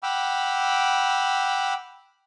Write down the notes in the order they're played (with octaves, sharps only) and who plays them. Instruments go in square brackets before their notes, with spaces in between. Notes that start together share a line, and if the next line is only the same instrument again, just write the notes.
[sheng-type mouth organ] F#5 G5 B5 D6 E6 F6